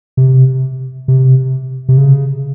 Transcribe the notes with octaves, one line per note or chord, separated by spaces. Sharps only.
C3
C3
C3
C#3